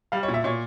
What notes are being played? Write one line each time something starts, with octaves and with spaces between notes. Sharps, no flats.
G3 F5
C#5
A#2
E5
A#2 C#5